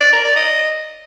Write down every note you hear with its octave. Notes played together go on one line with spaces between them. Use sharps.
D5
A#4
D5
D#5